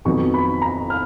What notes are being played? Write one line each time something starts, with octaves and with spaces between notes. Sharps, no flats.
F2 D#3 F#3 B3 C#6
B5
A#5
F6